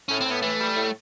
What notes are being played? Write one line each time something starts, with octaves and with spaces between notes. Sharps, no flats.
A2 C#4
A2 C4
B3
E3 A3
G3
A2